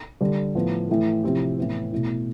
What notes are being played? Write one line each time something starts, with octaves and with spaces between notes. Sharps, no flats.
D3 G3 D4
A2 F3 B3
A2 E3 A3
C3 F3 C4 E4 G4
A2 E3 B3
B2 A3 E4